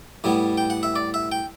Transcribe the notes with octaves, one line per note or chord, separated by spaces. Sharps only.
A2 G3 B3
G5
F#5
E5
D5
E5
G5